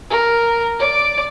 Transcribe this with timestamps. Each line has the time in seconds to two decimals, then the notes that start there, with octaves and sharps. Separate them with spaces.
0.10 A#4
0.79 D5 D6